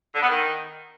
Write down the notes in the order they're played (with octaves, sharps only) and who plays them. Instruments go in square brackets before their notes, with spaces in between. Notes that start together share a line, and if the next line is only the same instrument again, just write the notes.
[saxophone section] D3
B3
D#3